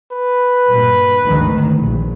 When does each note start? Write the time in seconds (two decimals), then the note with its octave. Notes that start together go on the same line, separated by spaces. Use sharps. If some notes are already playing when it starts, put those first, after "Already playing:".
0.12 B4
0.68 G2 A#2
1.25 G#1 D2 D#3
1.80 A#1